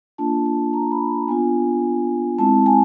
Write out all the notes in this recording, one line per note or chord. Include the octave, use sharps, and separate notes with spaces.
A#3 D4 F4 A5
A5
A#5
B5
B3 D4 F4 G#5
G#3 C4 E4 A5
G#5